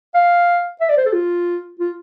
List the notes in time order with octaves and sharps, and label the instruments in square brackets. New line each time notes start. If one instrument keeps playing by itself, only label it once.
[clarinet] F5
E5
D5
C5
A4
F4
F4